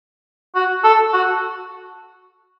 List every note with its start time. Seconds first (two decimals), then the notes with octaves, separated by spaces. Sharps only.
0.55 F#4
0.84 A4
1.13 F#4